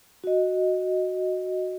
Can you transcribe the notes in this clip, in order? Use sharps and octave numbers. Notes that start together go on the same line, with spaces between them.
F#4 D#5